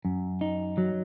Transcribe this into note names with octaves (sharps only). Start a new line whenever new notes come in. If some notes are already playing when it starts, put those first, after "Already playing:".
F#2
D#4
F#3